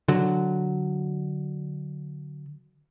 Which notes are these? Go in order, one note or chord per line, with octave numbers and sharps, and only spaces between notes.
D3 F#3